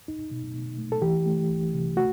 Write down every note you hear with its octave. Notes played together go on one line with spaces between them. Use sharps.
D#4
B2
B2
A3
A4
E3 G4
A3
C2
C3
A3 F#4